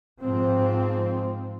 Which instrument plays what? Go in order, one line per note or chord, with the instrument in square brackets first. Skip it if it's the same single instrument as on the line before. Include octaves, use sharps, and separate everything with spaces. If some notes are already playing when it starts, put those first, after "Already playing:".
[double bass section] G#2 F3 C4